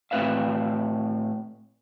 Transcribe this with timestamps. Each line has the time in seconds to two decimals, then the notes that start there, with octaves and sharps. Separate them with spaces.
0.11 A2 C4 B4 E5 F5